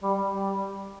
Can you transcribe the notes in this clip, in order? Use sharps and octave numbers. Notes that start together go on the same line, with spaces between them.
G3
G3